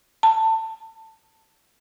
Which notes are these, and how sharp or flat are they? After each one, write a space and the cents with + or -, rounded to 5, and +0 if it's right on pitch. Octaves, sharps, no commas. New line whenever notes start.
A5 +20